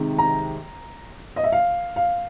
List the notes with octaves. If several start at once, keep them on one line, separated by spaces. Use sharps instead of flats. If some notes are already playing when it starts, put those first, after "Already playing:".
Already playing: C3 D#3 G#3
A#5
D#5
E5
F5
F5